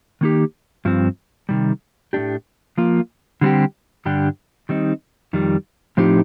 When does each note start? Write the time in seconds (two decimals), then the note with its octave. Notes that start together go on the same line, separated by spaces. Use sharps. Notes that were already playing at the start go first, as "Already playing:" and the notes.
0.21 D#3 A#3 D#4 G4
0.85 G2 F3 C4
1.49 C3 D#3 G3
2.13 A2 A3 D4 G4
2.78 F3 A#3 F4
3.41 D3 G3 C4 G4
4.05 G2 D3 G3 D4 G4
4.69 D#3 G3 C4 D#4
5.33 F2 D#3 G3
5.97 A2 F3 C4 D#4 G4